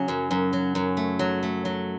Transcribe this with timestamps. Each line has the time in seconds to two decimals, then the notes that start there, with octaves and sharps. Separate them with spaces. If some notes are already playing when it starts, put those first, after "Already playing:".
Already playing: C#3 F#3 C#4
0.08 F#2
0.31 F#2
0.53 F#3
0.75 F#2
0.97 A3
1.19 F#3
1.43 A3
1.65 F#3